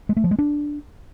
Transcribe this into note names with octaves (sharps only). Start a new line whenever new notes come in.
G#3
A3
F3
G#3
D4